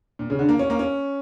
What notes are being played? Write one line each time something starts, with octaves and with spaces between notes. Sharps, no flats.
A#2
C#3
D3
A#3
C#4
A#3
C#4